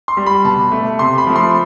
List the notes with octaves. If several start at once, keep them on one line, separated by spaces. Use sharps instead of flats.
C6
G3
B5
B2 A5
A3
C3 C6
B5
F3 A3
C6